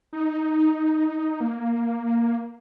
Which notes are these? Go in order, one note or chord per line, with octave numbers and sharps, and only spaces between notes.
D#4
A#3